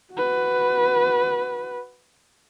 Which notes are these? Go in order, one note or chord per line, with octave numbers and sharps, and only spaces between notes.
F#4 B4